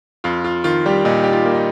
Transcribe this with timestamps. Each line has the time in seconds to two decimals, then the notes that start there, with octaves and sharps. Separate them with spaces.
0.24 F2 F4
0.44 F4
0.64 D#3 F4
0.86 G3 G4
1.05 A#2 D#4
1.24 G4
1.33 F4
1.46 A#3
1.54 D#4